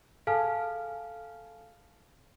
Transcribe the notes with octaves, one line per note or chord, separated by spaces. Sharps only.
G#4 A4 F5 G#5 A5 F6